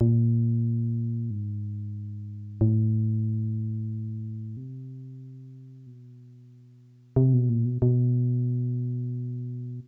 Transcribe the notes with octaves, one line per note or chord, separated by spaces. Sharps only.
A#2
G#2
A2
C3
B2
C3
B2
A#2
B2
B2